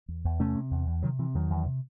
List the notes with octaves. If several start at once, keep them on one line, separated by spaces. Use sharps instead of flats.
E2
E2
C3 A3 C#4
C3
E2
E2
C3 D#3 F#3
C3 E3
E2 D#3 F#3
E2
C3